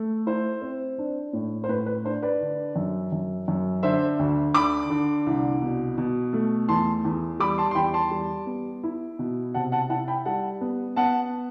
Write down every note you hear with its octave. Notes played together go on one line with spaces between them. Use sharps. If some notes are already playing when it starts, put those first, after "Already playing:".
Already playing: A3
E4 C5
C4
D4
A2
C5
A2 B4
B4
D4 C5
B4 D5
D3
F#2
F#2
F#2
D3 C5 E5
D2
D3 B5 D6
D3
C2
B2
B2
A3
E2 A5 C6
E2
G3 B5 D6
A5 C6
C6
E2 G5 B5
A5 C6
G3
B3
E4
B2
C3 F#5 A5
F#5 A5
E4 F#5 A5
G5 B5
G3 F#5 A5
B3
B3 F#5 A5